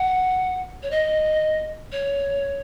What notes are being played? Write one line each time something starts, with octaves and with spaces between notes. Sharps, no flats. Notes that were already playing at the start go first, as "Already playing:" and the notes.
Already playing: F#5
C#5
D#5
C#5